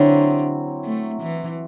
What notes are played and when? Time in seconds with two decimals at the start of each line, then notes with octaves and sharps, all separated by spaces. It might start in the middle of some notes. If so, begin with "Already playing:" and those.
Already playing: D3 F#3 C4 E4
0.85 A3
1.22 E3